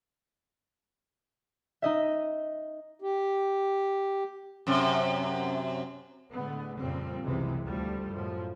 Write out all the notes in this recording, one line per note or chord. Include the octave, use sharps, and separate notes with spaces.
D#4 D#5 E5
G4
F#2 C3
A2 D3 G#3 A3 B3
F2 A#2 C#3 F3 G3 C4
F#1 C2 C3 E3 G#3
D2 F3 G3 A3
F#2 A2 F3